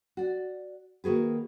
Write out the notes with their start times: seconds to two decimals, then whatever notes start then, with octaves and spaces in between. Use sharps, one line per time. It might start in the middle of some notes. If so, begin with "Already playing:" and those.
0.17 F#4 D5
1.04 D#3 A#3 F#4 G#4 B4